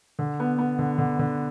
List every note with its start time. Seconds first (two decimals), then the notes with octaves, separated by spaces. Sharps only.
0.19 D3
0.40 B3
0.59 B3
0.79 D3
0.98 D3
1.19 D3